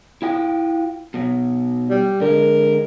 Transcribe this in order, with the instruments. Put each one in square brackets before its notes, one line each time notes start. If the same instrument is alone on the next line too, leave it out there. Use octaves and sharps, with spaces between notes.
[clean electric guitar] E4 F4 G5
B2 F#3
[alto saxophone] G3
[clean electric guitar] D3 G#3 [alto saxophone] A#4